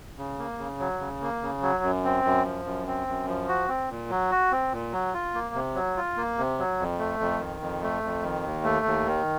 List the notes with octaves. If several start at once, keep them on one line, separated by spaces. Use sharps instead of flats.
C#3
A#3
C#3
F#3
C#3
A#3
C#3
F#3
F#2
C4
F#2
F3
F#2
C4
F#2
F3
F#4
C4
A#2
F#3
F#4
C4
A#2
F#3
F4
A#3
C3
F#3
F4
A#3
C3
F#3
F2
A3
F2
D#3
F2
A3
F2
D#3
D#2
A3
D#2
D#3